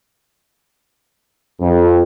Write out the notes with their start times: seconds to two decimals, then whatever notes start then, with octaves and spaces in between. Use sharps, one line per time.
1.60 F2